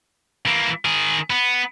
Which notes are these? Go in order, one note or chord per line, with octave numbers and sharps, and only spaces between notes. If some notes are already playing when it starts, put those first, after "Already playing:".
E3 A#3
D#3 G#4
B3